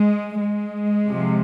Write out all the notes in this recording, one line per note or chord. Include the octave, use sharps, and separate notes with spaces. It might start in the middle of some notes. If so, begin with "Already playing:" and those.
Already playing: G#3
G#3
C3 F3